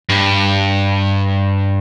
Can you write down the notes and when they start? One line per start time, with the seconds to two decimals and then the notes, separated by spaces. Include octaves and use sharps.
0.09 G2